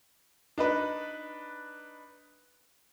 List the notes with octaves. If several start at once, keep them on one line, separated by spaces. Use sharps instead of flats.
D4 D#4 B4